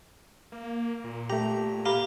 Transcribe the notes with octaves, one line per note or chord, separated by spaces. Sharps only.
A#3
A#2
A3 G4 A#5
G4 F5 A#5 B5